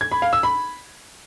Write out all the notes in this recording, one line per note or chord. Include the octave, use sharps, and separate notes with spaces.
G#6
B5
F5
E6
B5